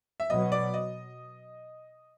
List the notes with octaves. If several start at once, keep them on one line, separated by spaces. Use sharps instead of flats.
E5
B2 F#3 B3 D#5
D5
D#5